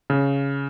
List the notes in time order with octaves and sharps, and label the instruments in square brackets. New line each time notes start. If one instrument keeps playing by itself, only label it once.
[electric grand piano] C#3